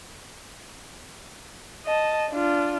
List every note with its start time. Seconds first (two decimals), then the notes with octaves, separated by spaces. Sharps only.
1.86 D#5 A5
2.31 D4 F4